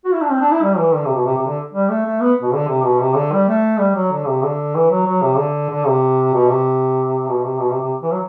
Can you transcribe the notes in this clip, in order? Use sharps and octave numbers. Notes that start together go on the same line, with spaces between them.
F#4
E4
D4
C4
D4
E4
G3
E3
D3
C3
B2
C3
C3
D3
G3
A3
A3
B3
B2
D3
C3
B2
C3
D3
G3
A3
G3
F#3
D3
C3
D3
E3
F#3
F#3
C3
D3
D3
C3
B2
C3
B2
C3
B2
C3
C3
E3
F#3